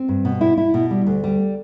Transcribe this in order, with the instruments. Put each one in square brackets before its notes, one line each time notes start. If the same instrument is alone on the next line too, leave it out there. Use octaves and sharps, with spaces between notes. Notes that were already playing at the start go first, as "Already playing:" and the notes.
Already playing: [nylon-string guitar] C4
G2
B2
E4
E4
B2
G3
D2
G3